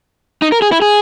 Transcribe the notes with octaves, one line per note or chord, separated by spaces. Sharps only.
D#4
A#4
G#4
E4
G#4